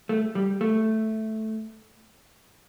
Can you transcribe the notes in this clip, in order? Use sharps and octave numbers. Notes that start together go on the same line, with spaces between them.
A3
G3
A3